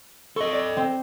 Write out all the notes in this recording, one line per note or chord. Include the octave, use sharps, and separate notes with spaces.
A4 D#5 C#6
D5
C4